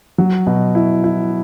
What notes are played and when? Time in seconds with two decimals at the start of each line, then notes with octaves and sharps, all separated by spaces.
0.18 F#3
0.47 B2
0.75 E4
1.04 E4